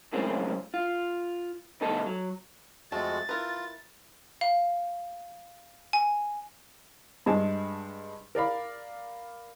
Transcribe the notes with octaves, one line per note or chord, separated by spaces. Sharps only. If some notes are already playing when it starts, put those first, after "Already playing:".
F#2 A2 C#3 G#3 C4
F4
D2 B2 D#4 A4
F#3
F2 G#3 A3 F#4 C5 A5 A6
E4 F4 A#4 B4
F5
G#5
G2 G3 G#3 G#4 A5
A#4 D5 F5 B5